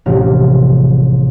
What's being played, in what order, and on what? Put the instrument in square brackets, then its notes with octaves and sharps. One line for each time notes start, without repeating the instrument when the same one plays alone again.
[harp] E1 A1 C3 F3 A#3 F6